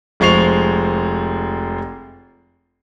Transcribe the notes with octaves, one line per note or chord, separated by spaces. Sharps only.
F1 F3 G#3 C#6 C7 F7